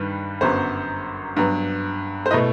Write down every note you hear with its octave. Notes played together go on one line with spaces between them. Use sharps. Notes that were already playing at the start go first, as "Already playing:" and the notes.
Already playing: G2 D#3 G3 B4
G1 F#2 F#3 B3 C5
G2 F#3 B3
C5
B2 A3 E4 B4 D#5